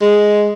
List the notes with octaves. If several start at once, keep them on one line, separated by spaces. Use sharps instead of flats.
G#3